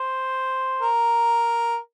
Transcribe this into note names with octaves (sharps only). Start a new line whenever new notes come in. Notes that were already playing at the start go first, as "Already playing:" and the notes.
Already playing: C5
A#4